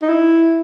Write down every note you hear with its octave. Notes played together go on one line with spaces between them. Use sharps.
D#4
E4